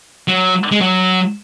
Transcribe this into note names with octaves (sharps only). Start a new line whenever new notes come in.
F#3
G#3
F#3